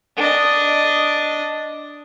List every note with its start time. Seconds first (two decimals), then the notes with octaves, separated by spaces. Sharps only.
0.17 D4 D#5